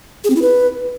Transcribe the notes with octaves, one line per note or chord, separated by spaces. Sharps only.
G#4
C4
E4
B4